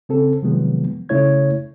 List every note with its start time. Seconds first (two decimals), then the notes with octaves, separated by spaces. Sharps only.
0.09 C#3 C4 A4
0.42 C3 D#3 F3 F#3 G#3 B3
1.09 C#3 A3 E4 C#5 G#6